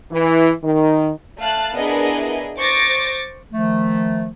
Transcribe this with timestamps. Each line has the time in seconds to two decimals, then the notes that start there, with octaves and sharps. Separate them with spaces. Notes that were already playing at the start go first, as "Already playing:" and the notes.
0.11 E3
0.62 D#3
1.38 A3 F5 A5 F#6
1.74 B3 D4 E4 G#4 A#4 D#5
2.58 C5 C#6 D6 A6 A#6
3.53 D#3 F3 A3